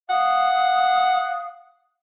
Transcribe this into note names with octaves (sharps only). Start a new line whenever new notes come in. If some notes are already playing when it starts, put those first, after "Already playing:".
F5 F#5 D#6